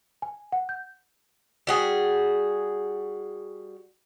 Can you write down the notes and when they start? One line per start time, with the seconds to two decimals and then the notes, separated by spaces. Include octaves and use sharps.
0.22 G#5
0.52 F#5
0.69 G6
1.67 G3 F#4 G#4